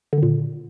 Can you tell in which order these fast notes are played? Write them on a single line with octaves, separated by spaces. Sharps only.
D3 D#3 A#2